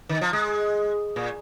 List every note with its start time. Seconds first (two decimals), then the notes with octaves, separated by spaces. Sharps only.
0.09 D#3
0.21 F3
0.33 G#3
1.16 A#2